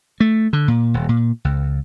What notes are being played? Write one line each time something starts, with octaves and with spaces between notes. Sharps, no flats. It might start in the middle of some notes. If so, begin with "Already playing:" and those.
A3
D3
A#2
D#1
A#2
C#2